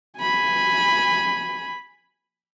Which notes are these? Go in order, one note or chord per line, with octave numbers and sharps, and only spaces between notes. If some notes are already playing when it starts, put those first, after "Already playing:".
G#5 B5